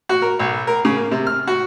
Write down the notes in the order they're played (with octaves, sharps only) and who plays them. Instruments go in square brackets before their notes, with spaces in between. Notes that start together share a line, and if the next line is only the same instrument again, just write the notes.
[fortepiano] F#4
A#4
B1
A#4
C#3
A#3
C3
F6
F#4